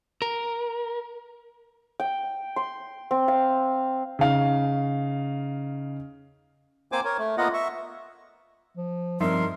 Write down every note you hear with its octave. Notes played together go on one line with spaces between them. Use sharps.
A#4
G5
C6
C4
F5
C#3 D#4 F5
A#3 C4 C5 G#5 D6
A#4 C#5
A3
A#3 B3 F4 D#5 F#5
E5 C#6
F3
G2 F3 C4 D#4 A#4 E5 C6